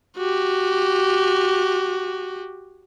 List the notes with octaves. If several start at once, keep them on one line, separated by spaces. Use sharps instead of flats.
F#4 G4